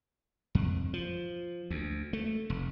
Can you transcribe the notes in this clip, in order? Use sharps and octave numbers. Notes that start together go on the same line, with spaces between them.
F2
F3
D2
A3
F1